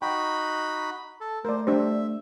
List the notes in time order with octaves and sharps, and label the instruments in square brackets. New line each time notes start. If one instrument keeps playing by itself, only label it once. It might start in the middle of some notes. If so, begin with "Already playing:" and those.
[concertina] D#4 F#4 B5 [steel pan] G5
[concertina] A4
[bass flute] A3 [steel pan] A#4 D5 [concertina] C5
[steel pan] D4 G4 C5 [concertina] E5